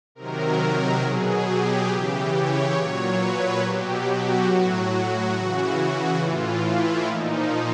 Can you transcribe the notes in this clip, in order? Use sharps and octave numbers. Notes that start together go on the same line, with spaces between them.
C3 D#3 F#3 A#4
B2 F#3 G#4
G4
C#3 E3
C#5
A#2 F#3
B4
B2 F#3 G4
F#4
A2 F#3
C#3 E3 F#4
A2 E3 F4
E4
A#2 F3 D#4